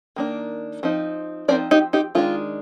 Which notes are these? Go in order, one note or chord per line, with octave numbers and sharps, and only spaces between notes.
D#3 A#3 D4
F3 C4 D#4
F3 C4 D#4 A#4 D5
D#4 G4
D#4 G4
D#3 G#3 D4 F4